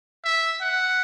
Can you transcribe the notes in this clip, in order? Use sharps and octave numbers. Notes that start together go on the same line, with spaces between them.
E5
F#5